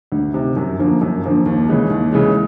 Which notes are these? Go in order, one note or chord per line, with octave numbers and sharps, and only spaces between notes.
D2
C3 D#3
F#2
D3 F3 A#3
F#2
D3 F3 A#3
D#2
C#3 E3 G#3
D#2
C#3 E3 G#3